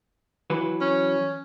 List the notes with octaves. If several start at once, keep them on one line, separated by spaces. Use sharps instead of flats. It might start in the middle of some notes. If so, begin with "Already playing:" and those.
E3 F#3 B4
C#4